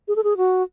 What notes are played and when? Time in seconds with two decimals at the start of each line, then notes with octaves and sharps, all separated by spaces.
0.08 G#4
0.16 A4
0.24 G#4
0.37 F#4